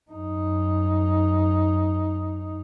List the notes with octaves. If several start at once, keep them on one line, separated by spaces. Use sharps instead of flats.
F#2 D#4